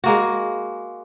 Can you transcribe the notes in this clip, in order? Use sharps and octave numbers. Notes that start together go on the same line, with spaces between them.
G#3 A#3 F#4